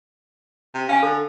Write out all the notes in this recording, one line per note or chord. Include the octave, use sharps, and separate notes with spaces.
C3
C#4 F5 G5 G#5
D3 A4